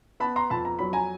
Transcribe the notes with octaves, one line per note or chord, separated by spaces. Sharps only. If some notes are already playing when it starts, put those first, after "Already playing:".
B3 A5 B5
A#5 C6
F2 A5 B5
A#5
F#3 B5
G#5 A#5